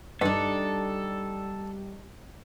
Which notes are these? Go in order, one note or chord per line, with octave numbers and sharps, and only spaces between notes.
G2 G3 D4 D#4 A4